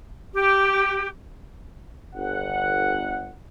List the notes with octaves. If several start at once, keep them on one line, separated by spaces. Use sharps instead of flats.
G4
G1 F#5